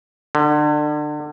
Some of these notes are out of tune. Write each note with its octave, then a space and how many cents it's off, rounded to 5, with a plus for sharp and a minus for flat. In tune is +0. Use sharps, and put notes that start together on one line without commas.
D3 +30